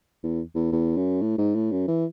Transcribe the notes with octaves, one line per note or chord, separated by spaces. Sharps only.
E2
E2
E2
F#2
A2
G#2
A2
F#2
E3